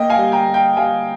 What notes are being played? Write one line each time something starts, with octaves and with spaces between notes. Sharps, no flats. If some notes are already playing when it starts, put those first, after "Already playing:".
Already playing: A#3 D#5 G5
F5 G#5
G3
G5 A#5
A#3
G5 A#5
G3 F5 G#5